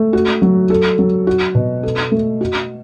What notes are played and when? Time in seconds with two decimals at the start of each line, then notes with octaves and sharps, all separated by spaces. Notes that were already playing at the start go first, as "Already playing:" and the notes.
Already playing: A3
0.13 F#4
0.42 F#3
0.70 A4
0.99 F#3
1.27 F#4
1.55 B2
1.83 A4
2.12 A3
2.41 F#4